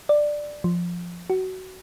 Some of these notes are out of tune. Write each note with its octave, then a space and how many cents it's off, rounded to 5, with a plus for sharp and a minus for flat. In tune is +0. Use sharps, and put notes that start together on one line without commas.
D5 +10
F3 +0
F#4 +20